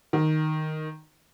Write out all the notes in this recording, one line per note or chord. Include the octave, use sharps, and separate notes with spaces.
D#3